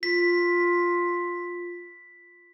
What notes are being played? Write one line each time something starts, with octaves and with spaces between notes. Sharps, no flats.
F4 B6